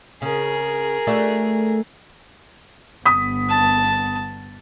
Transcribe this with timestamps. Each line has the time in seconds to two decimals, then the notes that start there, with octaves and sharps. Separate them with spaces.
0.22 C#3 G#4 A#4
1.07 A3 D4 F#4
3.06 G1 B3 D#6 B6
3.50 A5